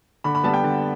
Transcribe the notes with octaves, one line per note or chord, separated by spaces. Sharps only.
D3 B5
B5
G3 B3 A5
G5
D3